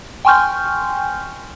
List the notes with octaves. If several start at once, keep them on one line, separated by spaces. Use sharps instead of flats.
G5 G#5 C6 C#6 F6 G6